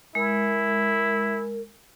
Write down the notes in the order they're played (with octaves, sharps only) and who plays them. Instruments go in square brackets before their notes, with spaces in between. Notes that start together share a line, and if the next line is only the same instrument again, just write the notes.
[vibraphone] G#3 [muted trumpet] E4 [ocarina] A#4